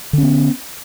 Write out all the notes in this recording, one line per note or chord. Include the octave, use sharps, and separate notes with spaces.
D3 B3 C#4